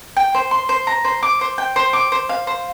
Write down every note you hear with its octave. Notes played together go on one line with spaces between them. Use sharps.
G5
C5
C6
C5
A#5
C5
D6
C5
G5
C5
D6
C5
F5
C5